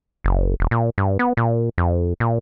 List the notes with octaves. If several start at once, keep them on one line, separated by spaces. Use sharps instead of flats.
F#1
E1
A#2
G2
B3
A#2
F2
A#2